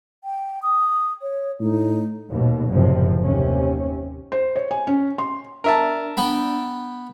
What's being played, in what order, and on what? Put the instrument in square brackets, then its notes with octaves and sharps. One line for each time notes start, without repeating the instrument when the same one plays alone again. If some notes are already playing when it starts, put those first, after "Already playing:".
[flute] G5
D#6
C#5
[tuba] A2 [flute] D#4
[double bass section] D#2 B2
F#1 F#2 A2 C3 F3
D#2 C3 C#4
[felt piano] C5
C#5
G#5
C#4
C6
[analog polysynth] D4 [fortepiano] A#4 E5 A5
[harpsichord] B3 G5 B5